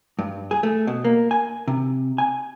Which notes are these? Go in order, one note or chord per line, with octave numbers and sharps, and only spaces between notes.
G2
G#4
A3
B2
A#3
G#5
C3
G#5